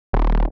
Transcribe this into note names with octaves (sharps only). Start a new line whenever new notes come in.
D#1